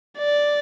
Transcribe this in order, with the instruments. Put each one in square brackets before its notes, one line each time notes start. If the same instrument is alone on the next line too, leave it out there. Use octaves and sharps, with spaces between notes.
[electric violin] D5